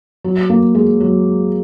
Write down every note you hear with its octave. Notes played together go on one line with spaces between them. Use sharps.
F#3
A#3
G#3
F#3